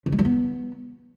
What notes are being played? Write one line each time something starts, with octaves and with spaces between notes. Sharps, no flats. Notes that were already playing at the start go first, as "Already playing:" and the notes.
C#3
G#3
G3
B3